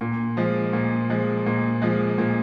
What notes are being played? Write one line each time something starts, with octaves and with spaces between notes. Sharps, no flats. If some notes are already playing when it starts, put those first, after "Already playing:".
A#2
F3 G#3
A#2
F3 G#3
A#2
F3 G#3
A#2